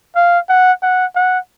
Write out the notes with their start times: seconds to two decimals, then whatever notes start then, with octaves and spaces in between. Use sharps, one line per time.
0.16 F5
0.49 F#5
0.82 F#5
1.15 F#5